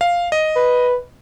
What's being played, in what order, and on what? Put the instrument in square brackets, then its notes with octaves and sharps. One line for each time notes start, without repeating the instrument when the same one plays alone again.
[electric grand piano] F5
D#5
[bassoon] B4